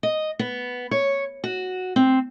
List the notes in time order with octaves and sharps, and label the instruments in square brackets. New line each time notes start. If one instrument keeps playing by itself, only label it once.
[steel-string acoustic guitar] D#5
B3
C#5
F#4
C4